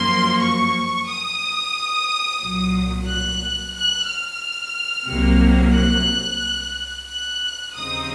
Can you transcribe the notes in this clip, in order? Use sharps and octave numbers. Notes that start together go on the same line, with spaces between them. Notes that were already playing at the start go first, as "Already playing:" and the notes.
Already playing: F#2 F3 A#3 C6
C#6
D#6
C2 A#2 F#3
F#6
F#6
F6
C2 C3 F#3 A#3
F#6
F#6
D#2 C#3 F3 C4 D#4 D#6